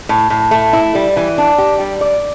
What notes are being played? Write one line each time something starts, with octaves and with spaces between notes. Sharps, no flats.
A2
A2
A3
E4
G3
E3
D4
G4
G3
D5